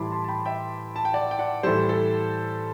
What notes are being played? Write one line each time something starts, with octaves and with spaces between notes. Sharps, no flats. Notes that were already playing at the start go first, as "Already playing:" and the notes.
Already playing: A2 E3 G3 A5 B5 C6 D6
A5 C6
A5
G5 B5
E5 G5
A5
G5
D5 F#5
G5
D5 F#5
A2 E3 G3 A4 C5
A4